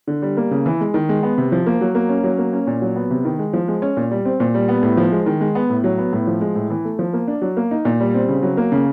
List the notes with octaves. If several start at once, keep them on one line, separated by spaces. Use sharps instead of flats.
D3
G3
A#3
C#3
E3
G#3
D#3
G#3
B3
C3
F3
A#3
F#3
A#3
C#4
F#3
A#3
C#4
A#2
F#3
B3
C3
D#3
G#3
F3
G#3
C#4
A#2
G3
C4
A#2
G3
B3
A2
F3
G#3
D#3
G#3
B3
A2
F#3
B3
A2
F3
G#3
A2
E3
A3
F3
A#3
D4
F#3
A#3
D#4
A#2
G3
C4
C#3
F#3
A#3
C#3